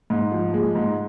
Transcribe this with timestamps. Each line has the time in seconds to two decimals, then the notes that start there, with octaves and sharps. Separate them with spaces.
0.10 G#2
0.32 F3
0.54 G#3
0.75 G#2